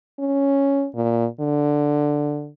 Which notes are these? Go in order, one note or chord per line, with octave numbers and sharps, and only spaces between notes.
C#4
A#2
D3